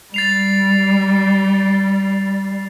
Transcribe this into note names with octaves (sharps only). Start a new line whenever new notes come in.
G3 A6 C7 F7